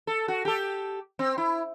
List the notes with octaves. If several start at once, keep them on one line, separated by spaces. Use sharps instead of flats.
A4
F#4
G4 A4
C4
E4